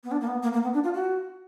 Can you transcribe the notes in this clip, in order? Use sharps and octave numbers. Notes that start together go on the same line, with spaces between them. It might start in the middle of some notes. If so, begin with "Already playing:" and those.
B3
D4
A#3
B3
A#3
A#3
B3
D4
F4
F#4